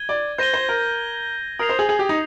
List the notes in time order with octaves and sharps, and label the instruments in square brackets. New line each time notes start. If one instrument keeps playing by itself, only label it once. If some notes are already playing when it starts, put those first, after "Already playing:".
Already playing: [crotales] G#6 D#7 G7
[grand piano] D5
[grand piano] C5 [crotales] G6 A#6 D#7 G7
[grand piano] C5
A#4
[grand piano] A#4 [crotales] D#6 G#6 C7 F7
[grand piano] C5
G#4
G#4
G4
D#4